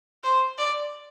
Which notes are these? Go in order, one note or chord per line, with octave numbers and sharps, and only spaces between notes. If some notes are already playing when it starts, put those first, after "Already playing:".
C5
D5